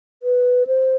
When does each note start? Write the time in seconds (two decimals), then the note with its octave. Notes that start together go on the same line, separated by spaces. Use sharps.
0.23 B4
0.67 C5